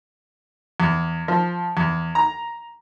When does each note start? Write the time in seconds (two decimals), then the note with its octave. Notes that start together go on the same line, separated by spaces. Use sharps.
0.80 E2
1.28 F3
1.77 E2
2.15 A#5